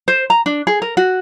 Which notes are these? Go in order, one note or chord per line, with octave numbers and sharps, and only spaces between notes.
C5
A#5
D4
G#4
A#4
F#4